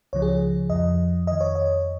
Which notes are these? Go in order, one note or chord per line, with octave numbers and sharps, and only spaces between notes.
C#2 C#3 F3 C#5
G#4
F2 F3 D#5
F2 D#3 D#5
C#5
D#5